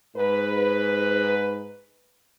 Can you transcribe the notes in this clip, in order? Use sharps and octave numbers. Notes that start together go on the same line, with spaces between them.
G#2 B4